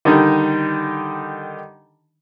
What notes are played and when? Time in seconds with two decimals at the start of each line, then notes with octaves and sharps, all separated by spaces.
0.05 D3 D#3 G3 D#4